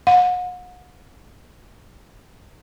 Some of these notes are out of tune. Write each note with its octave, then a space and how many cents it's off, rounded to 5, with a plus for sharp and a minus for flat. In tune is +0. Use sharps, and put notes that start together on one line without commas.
F#5 -40